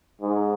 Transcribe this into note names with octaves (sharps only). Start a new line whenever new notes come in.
G#2